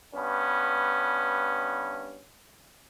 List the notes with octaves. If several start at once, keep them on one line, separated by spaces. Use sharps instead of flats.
G2 B3 C#4